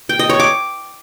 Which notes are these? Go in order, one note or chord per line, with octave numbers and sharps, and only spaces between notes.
G5
D#5
C#5
D6